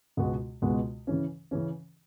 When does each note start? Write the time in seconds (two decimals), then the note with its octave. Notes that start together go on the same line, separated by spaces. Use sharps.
0.17 C#2 B2 G#3 B3 F#4
0.62 C#2 B2 G#3 B3 F#4
1.07 C#3 E3 C#4
1.51 C#3 E3 C#4